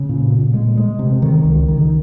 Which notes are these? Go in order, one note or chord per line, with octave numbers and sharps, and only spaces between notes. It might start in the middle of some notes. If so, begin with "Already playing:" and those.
Already playing: C#3
A#2
A#2
G#3
G#3
C3
D#3
C#2
D#3